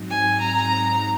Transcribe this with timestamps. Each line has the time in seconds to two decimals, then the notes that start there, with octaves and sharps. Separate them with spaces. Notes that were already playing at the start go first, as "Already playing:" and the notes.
Already playing: G#2 F#3 C4 D#4
0.10 G#5
0.41 A#5